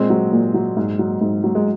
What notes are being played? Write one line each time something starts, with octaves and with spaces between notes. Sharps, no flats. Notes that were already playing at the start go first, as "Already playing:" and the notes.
Already playing: A#2 G#3 C4
F#3
A#2
F#3
G#2
F#3
G#2
F#3
G#3